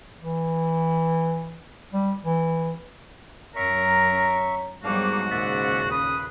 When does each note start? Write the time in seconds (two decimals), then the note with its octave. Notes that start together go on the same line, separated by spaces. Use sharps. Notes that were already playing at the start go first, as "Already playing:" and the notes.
0.22 E3
1.92 G3
2.24 E3
3.56 F#2 A#4 C#5 E5 A#5 C#6
4.84 G#2 F#3 G3 A#3 B3 D4 F#4 F5
5.31 D#2 A#2 C#3 D5 E5 F#5
5.91 B4 D#6